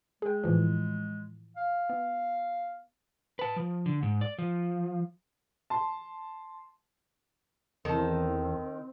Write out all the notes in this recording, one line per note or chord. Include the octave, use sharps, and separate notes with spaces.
G#3 G#4 G5
A2 E3 F3
F5
B3
B4 A5
F3
D3
G#2
D5
F3
A5 C6
E2 D#3 C4 A4 C5 A5